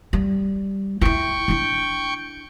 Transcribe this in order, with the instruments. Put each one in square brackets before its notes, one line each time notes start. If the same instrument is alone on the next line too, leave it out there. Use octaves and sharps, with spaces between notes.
[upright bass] G3
[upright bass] E4 F4 [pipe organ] G5 C#6
[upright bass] D4 E4